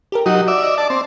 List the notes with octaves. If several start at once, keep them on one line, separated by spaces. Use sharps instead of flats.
G4 A4 A#4
F#3 D#4 F#4 G4 D#5
D5 E5
D#5
D5 A5
C4